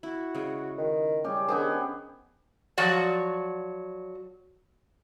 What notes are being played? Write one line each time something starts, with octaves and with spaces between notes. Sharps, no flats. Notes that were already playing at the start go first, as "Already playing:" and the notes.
E4 F#4
C#3 G#3
D#3
G3 C#4 G4 G#4
D#3 B3 D4 G4 G#4 C5
F3 F#3 F#4 D5